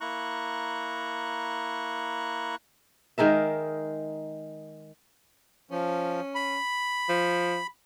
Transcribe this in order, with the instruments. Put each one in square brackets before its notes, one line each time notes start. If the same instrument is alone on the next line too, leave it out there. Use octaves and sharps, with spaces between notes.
[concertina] A#3 E4 A#5 C#6 F#6
[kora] D#3 G#3 A#4 E5
[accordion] F3 [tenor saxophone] C#4
[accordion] B5
[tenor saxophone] F3